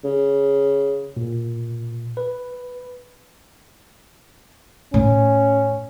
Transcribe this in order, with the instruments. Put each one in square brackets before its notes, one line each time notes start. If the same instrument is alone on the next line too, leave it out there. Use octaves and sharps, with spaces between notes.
[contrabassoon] C#3
[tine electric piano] A#2
B4
[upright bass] A2 D#4 [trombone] C#4